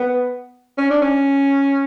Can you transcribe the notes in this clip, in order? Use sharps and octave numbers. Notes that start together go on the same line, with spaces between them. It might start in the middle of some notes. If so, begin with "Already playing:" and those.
Already playing: B3
C#4
D4
C#4